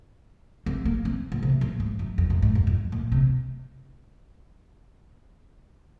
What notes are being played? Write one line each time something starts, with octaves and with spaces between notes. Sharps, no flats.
C4
A#3
C4
A#2
C3
A#2
G#2
F#2
F2
F#2
G#2
F#2
F2
A#2
C3